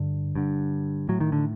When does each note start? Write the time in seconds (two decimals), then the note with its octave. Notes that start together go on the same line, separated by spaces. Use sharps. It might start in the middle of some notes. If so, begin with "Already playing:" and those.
Already playing: G2 D3
0.35 G2 D3
1.09 A2 F#3
1.20 D#3
1.32 D3